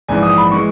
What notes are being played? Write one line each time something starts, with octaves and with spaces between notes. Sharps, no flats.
A#1 G#2 E3 G#5
D#6
B5
E3 G#3 C#6